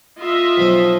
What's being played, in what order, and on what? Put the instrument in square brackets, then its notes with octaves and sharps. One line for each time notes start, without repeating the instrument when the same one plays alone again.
[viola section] F4 D#5 E5
[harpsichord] B1 F3 F5